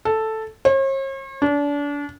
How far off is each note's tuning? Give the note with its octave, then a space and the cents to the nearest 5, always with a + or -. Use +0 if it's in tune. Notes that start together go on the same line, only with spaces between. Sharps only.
A4 +0
C#5 -45
D4 -30